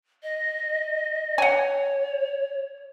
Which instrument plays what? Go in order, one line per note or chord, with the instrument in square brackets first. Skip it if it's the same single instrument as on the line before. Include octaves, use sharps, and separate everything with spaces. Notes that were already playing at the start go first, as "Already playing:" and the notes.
[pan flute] D#5
[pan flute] C#5 [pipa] F#5 G#5